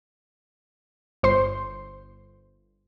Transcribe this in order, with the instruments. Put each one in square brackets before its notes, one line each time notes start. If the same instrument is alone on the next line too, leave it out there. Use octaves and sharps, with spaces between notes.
[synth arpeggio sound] G1 C5 C6